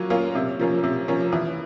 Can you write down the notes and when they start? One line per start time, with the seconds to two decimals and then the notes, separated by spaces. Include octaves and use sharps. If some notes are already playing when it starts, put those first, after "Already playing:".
Already playing: F#3 A#3 C#4 F4
0.10 A#3 C#4 F4
0.35 C3
0.59 F3 A#3 C#4
0.84 C3
1.08 F3 A#3 C#4
1.33 E3